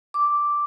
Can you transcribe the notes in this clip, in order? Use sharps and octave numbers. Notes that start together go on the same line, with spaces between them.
D6